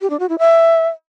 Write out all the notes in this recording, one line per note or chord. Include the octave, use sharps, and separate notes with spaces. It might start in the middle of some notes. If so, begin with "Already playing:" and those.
G4
D4
F#4
E4
E5